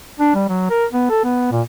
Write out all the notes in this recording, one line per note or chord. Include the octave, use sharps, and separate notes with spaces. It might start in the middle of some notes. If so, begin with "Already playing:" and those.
D4
G3
F#3
A#4
B3
A4
B3
A#2